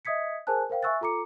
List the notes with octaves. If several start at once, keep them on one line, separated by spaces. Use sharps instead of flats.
D#5 E5 D#6 G#6 B6 C#7
G#4 A#4 C5 G#5 A5 F#6
A#4 C5 F5 G5
E5 G#5 C#6 E6 F#6 A6
F4 A4 A#5 D6 C#7